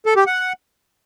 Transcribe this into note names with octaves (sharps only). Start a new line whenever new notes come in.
A4
G4
F#5